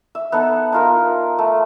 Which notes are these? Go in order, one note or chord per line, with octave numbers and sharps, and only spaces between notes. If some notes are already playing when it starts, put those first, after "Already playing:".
E5
B3 D#4 A4 F#5
D#4 F4 A#4
A3